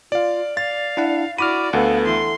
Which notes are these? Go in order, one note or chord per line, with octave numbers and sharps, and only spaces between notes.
F4 D5 F5
D5 F5 A6
D4 E4 F#5
E4 F#4 D5 B5 D6 F6 D#7
D2 B3 A4 F5 F#5
E3 C6